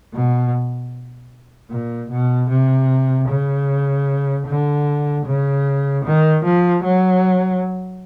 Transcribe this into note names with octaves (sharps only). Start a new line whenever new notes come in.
B2
A#2
B2
C3
C#3
D3
C#3
D#3
F3
F#3